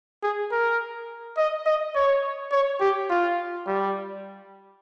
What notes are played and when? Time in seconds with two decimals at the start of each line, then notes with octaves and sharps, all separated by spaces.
0.23 G#4
0.52 A#4
1.37 D#5
1.66 D#5
1.95 C#5
2.52 C#5
2.80 G4
3.10 F4
3.67 G3